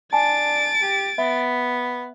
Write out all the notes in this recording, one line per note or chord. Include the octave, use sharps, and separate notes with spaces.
D4 G#5 A5 A6 D7
G4
B3 E5